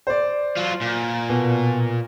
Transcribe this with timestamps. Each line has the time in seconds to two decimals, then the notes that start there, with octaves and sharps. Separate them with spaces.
0.07 C5 D5
0.57 F#3 F4
0.81 A#2
1.29 B2